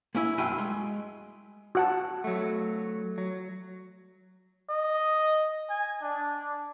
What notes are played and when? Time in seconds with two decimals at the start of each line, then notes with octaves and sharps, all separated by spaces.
0.15 A#3 C#4 E4
0.38 F#2 F#3 A3 G5 G#5 B5
0.58 G#3
1.75 F#4 F#5 A5
2.24 F#3 A3
3.18 F#3
4.69 D#5
5.70 G#5
6.02 D4